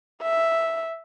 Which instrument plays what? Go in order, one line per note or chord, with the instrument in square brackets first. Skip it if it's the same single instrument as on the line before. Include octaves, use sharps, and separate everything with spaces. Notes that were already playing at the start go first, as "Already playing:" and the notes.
[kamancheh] E5